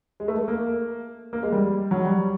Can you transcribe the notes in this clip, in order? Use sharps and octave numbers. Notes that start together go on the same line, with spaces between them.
G#3
A3
A3
A#3
A#3
G#3
G3
F#3
G3